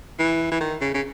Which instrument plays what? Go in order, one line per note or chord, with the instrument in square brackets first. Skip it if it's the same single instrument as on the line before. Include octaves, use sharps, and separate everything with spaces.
[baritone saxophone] E3
E3
D#3
C#3
C#3